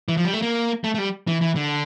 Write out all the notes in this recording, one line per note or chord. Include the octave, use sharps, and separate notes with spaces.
E3
F3
G3
A3
A#3
A3
A3
G3
E3
E3
D3